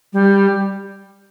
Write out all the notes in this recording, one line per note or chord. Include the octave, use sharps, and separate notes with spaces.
G3